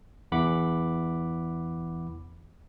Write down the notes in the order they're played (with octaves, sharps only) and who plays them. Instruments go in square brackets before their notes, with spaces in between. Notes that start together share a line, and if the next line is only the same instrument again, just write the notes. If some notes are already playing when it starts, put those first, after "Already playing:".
[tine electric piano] E2 E3 F#5 B5 D6